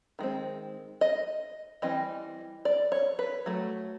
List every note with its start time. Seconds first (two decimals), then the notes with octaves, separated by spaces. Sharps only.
0.19 D#3 G#3 C4
1.01 D#5
1.82 E3 G3 C4 D#5
2.65 D5
2.92 C#5
3.19 B4
3.46 F#3 A3